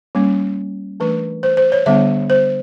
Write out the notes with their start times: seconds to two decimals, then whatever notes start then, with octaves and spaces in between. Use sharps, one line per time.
0.15 G3 A#3 C#4
1.00 E3 A3 D4 B4
1.43 C5
1.57 C5
1.72 C#5
1.86 D3 G3 B3 D4 E5
2.30 C5